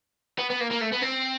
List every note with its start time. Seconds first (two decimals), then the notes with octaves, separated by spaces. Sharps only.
0.39 B3
0.50 B3
0.61 A#3
0.71 A#3
0.81 A3
0.93 B3
1.02 C4